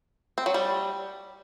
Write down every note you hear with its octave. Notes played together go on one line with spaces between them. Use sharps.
C4
F#3
G3